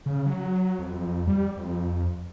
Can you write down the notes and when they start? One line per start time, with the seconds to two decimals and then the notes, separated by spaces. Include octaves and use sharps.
0.06 C#3
0.26 F#3
0.79 F2
1.27 G3
1.57 F2